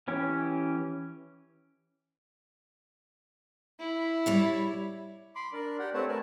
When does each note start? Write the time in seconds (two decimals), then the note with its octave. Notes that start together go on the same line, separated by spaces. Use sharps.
0.08 E3 C#4 G4
3.80 E4
4.26 G3 C#5 E5
5.35 B5 C6 D6
5.53 D4 A#4 D5
5.79 G4 D5 F#5 G5
5.94 A3 C4 B4 C#5 F#5 A5
6.08 A#4 D5 G#5 A5